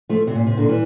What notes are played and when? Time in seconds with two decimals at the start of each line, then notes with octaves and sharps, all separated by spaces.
0.09 F3 A3
0.27 C3
0.35 A#2
0.47 C3
0.57 A#2 D3
0.69 E3 G3